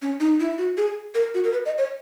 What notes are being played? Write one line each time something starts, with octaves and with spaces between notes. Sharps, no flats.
C#4
D#4
E4
F#4
G#4
A#4
F#4
A#4
B4
D#5
C#5